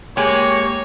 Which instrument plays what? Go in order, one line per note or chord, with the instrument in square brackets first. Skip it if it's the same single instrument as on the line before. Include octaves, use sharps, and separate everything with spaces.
[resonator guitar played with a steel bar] G#3 A#3 [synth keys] G4 G#5 [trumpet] C#5 [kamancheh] C#6